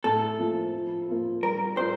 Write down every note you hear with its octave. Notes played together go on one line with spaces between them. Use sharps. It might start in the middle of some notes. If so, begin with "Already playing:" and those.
A2 A4
F3 A#3
F3
A#3 F4
G3 A#4
D4 F4 A#4 C5